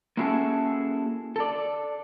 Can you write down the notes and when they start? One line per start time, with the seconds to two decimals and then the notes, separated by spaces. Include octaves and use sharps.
0.17 A#3 C#4 E4 F#4 G#4 A4
1.36 A4 D5